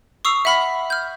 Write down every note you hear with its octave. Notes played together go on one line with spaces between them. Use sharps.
C#6 D#6 E6 C7 F7
E5 F#5 B5 F6 B6
F6 G6